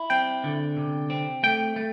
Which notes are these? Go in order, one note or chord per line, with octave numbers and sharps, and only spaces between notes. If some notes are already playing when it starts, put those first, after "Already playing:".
Already playing: E4
C4 G5
D3
C3
C4
A3 G5
A3